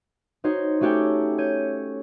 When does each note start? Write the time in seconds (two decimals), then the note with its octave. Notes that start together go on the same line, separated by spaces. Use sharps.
0.44 D#4 F#4 C5 C#5
0.81 A3 C#4 F#4 G4 A4 G5
1.38 C#5 G6 D#7